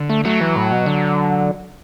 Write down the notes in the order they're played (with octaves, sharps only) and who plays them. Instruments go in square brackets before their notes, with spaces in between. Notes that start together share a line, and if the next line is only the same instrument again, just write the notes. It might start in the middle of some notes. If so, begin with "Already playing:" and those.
Already playing: [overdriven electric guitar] D3
[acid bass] A3
[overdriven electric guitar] F#3 [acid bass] A3
[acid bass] E3
A2
B2
D3